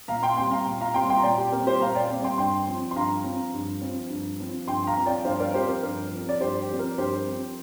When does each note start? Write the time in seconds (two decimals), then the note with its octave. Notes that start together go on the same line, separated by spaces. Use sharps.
0.08 A#2 F5 A#5
0.23 G5 C6
0.37 G3 C4 G5 C6
0.51 F5 A#5
0.66 A#2
0.81 F5 A#5
0.94 G3 C4 G5 C6
1.10 G5 C6
1.18 A#5
1.23 A#2 D5 G5
1.38 G4
1.52 G3 C4 A#4
1.66 G4 C5
1.80 A#2 F5 A#5
1.95 D5 G5
2.10 G3 C4
2.24 G5 C6
2.38 G2 G5 C6
2.67 F3 C4
2.91 C6
2.95 G2 F5 A#5
3.24 F3 C4
3.54 G2
3.81 F3 C4
4.10 G2
4.40 F3 C4
4.67 G2 G5 C6
4.87 F5 A#5
4.97 F3 C4
5.06 D5 G5
5.25 G2 C5 F5
5.40 A#4 D5
5.54 F3 C4 G4 C5
5.68 A#4
5.82 G2 A#4
6.11 F3 C4
6.29 D5
6.40 G2 G4 C5
6.60 G4
6.69 F3 C4
6.79 A#4
6.98 G2 G4 C5
7.26 F3 C4